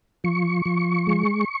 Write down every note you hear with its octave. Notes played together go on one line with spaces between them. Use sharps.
F3 C#6
F3
G#3